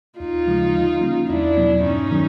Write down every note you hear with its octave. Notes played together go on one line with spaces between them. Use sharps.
D#2 D#4 F4
C#3 F3 G#3
D3
G3 A#3 C#4
E2 D4 E4
B2 F#3 B3
G2 C#4 D#4
D#3 F#3